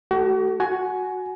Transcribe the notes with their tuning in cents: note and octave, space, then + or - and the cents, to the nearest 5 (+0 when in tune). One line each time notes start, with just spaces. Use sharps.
A3 -25 F#4 +40 A4 +0
F#4 +0 G#5 +20